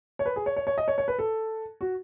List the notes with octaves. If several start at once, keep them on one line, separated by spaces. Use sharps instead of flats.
C#5
B4
G#4
C#5
C#5
C#5
D#5
C#5
C#5
B4
A4
F#4